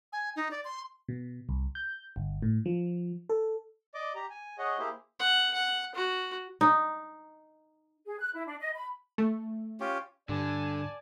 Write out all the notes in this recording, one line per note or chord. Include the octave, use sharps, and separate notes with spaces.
G#5
D#4
D5
C6
B2
C2
G6
G1
A2
F3
A4
D5 D#5 D6
G4 A#5
G#5
G#4 C#5 D#5 F#5
A#3 E4 G4 G#4 C5
F#5
F#5
F#4
D#4
G#4
F#6
E4
D4
D#5
B5
A3
C#4 F4 G4
G2 D3 D5 G#5 A5